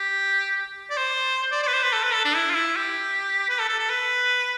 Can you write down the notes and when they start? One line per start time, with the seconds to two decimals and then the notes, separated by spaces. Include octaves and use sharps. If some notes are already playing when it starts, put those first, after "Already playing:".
Already playing: G4
0.90 D5
0.97 C5
1.52 D5
1.63 D5
1.67 B4
1.73 C5
1.83 B4
1.93 A4
2.03 B4
2.13 A4
2.25 D4
2.35 E4
2.50 F4
2.55 E4
2.76 G4
3.49 B4
3.59 A4
3.69 A4
3.79 A4
3.89 B4